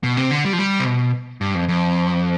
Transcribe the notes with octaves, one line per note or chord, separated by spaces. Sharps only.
B2
C3
D3
G3
F3
G3
C3
B2
G2
F2
F2